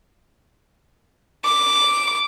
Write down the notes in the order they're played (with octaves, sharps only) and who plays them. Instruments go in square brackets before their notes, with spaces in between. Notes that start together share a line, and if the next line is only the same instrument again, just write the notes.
[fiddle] D6